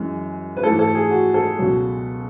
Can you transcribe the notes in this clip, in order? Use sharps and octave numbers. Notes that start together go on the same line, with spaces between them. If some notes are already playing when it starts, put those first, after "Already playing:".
Already playing: F#2 E3 G#3
B4
G#2 E3 A3 A4
A4
G#4
F#4
A4
C#2 B2 F#3